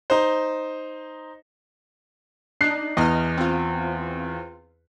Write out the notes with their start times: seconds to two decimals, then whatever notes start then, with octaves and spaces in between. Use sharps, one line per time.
0.10 D#4 C5
2.61 D4 D#4 F#6 C7
2.97 E2 D#5 F6
3.37 C4 F4